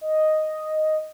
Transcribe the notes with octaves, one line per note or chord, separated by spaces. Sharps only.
D#5